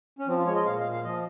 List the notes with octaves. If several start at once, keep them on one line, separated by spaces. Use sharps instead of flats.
C#4
F3 C4
F4
G#3 C#5
D#5
A#2 F5
F5
A#2
F5
F3 D#5